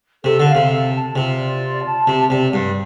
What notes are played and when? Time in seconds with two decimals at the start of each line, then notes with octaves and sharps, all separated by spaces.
0.24 C3 A4
0.40 D3
0.48 F5
0.55 C3
0.71 A4
0.93 A5
1.16 C3 F4
1.39 D5
1.62 F4
1.84 A5
2.07 C3 G4
2.30 C3 D5
2.53 G2 G4